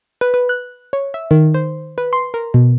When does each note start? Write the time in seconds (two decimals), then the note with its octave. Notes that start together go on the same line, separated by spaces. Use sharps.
0.21 B4
0.34 B4
0.49 F#6
0.93 C#5
1.14 E5
1.31 D#3
1.54 C5
1.98 B4
2.13 C6
2.34 A#4
2.54 B2